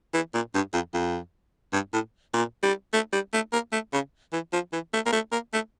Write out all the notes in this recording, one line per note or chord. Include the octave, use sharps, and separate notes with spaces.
E3
A#2
G2
F2
F2
G2
A2
A#2
G3
A3
G3
A3
A#3
A3
C#3
E3
F3
E3
A3
A#3
A3
A#3
A3